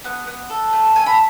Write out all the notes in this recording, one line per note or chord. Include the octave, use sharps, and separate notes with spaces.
B3 F#5
B3
A4
A3
A4 G#5
B5